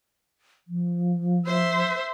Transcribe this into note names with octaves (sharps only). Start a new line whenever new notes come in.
F3
C5 E5